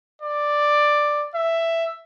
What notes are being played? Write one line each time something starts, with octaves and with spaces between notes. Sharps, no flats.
D5
E5